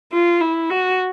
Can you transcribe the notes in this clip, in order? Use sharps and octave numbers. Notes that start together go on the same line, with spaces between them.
F4
E4
F#4